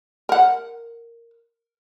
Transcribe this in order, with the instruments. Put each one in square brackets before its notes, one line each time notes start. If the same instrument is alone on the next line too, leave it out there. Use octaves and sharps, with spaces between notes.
[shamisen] A#4 F#5